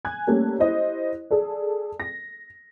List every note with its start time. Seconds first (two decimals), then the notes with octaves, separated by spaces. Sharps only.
0.05 G#5 F#6 G#6
0.27 G3 A3 A#3 C#4 G4 A4
0.59 E4 G4 C5 D#5
1.31 G#4 A4 D5
2.00 A#6